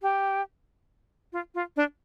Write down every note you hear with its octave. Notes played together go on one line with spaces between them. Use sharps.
G4
F4
F4
D4